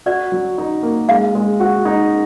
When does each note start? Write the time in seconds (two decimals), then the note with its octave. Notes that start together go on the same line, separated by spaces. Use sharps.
0.06 F#4 D5
0.32 F#3
0.58 D#4
0.83 A#3
1.09 G#3 F5
1.35 G#3
1.60 F#4
1.85 D#4